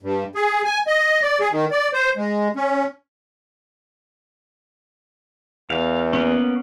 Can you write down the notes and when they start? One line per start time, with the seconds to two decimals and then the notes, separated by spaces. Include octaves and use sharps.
0.03 G2
0.35 G#4
0.65 G#5
0.87 D#5
1.22 D5
1.40 G#4
1.52 D#3
1.71 D5
1.93 C5
2.17 G#3
2.56 C#4
5.70 E2 F5
6.13 A#3 B3 C#4